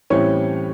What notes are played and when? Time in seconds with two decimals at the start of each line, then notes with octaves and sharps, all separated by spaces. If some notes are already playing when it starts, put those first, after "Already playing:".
0.10 A2 E3 G3 C4 C#4 C#5